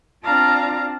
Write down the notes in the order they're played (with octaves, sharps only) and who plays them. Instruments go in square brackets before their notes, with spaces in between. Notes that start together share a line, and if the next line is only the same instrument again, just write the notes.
[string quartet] C4 D4 F4 F5 A5 A#5